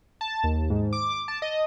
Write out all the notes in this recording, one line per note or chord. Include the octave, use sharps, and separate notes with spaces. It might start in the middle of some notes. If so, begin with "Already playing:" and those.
A5
D#2
G#2
D6
A5
D#5